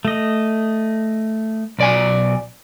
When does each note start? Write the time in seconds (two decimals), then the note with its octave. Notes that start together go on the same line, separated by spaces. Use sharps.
0.05 A3 D#5
1.79 B1 D5 G#5